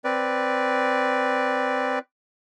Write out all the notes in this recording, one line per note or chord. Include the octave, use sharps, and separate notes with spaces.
C4 B4 D5